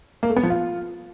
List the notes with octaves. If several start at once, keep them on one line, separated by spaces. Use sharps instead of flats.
A#3
A3
B3
F3
F4